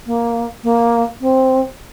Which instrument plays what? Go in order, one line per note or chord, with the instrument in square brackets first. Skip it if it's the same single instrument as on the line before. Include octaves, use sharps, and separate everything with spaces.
[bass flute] A#3
A#3
C4